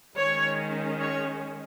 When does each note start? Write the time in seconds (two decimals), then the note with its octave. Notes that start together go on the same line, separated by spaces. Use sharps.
0.17 D#3 G#3 C#4 C#5
1.01 C#5